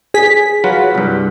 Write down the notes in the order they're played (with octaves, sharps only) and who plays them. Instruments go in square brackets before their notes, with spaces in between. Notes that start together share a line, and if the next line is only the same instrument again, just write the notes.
[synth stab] G#4 B6
[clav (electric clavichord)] F#3 F4 B4
C2 G2